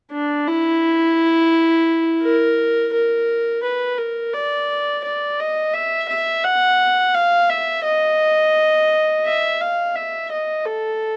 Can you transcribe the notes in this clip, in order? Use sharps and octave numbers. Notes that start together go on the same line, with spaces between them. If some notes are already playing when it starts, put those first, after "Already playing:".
D4
E4
A#4
A#4
B4
A#4
D5
D5
D#5
E5
E5
F#5
F5
E5
D#5
E5
F5
E5
D#5
A4